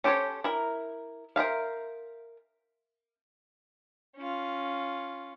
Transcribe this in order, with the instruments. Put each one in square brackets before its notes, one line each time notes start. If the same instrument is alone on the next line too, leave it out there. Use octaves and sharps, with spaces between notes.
[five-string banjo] C#4 G4 A4 C5 C#5
E4 A#4
A#4 C5 E5 F5
[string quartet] C#4 F4